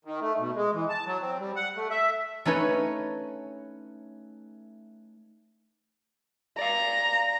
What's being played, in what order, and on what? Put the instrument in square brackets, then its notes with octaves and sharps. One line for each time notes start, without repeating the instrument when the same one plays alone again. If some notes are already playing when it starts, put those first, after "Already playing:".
[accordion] D#3
A3
B2
G#3
E3
A5
F#3
C4
G3
F#5
A3
E5
[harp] A3 C#4 D#4 B4 C#5
[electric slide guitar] D5 F5 [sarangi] A#5